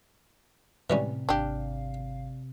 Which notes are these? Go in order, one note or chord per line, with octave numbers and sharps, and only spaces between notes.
A2 C3 E3 G3 C#4
G#1 D4 G4 F5